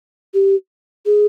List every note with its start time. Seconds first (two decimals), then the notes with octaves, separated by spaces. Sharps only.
0.34 G4
1.06 G#4